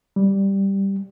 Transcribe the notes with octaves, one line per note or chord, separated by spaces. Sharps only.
G3